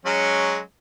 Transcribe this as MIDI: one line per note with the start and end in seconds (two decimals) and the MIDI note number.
0.05 0.59 54
0.05 0.59 56
0.05 0.59 61